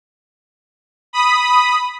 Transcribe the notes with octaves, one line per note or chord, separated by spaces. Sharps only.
B5 D#6